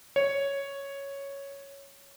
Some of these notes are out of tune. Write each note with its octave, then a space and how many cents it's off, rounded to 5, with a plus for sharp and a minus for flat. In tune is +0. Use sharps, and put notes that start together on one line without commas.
C#5 +0